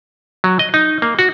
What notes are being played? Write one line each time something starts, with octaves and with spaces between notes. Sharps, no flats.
F#3
D#5
D#4
A#3
F#4